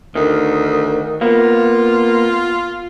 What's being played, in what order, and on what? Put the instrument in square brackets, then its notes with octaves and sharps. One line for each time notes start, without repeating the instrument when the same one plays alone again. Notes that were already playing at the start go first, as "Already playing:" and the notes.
[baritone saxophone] D2 [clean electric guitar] D#3
[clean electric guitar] A#3 B3 [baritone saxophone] F4